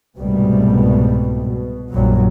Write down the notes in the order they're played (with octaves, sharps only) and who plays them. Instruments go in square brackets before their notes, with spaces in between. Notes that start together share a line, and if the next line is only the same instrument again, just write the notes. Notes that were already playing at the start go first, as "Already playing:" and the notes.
[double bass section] C2 G#2 B2 G3 A3 B3
B2
A#1 F#2 F#3 G3